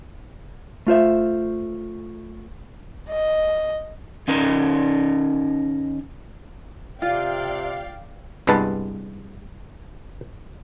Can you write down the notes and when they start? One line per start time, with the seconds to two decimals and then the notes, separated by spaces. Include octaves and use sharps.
0.87 A3 F4 C5 E5
3.10 D#5
4.28 D#3 C#4 D#4 A#4
7.02 C3 F4 D5 F5 G5
8.47 C2 G2 G#3 B3 B4 A5